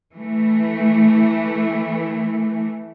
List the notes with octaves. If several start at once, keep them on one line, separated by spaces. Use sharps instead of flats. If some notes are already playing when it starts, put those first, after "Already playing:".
E3 A3